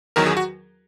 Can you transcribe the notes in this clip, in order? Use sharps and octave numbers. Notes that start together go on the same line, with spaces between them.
E2 D#3 F#3 A#4
G#4
F#4